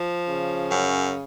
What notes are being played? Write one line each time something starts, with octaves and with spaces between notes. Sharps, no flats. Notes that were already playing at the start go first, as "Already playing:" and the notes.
Already playing: F3
C#3
F#2